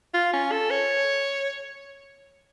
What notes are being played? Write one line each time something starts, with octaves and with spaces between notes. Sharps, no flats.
F4
C#4
A4
C#5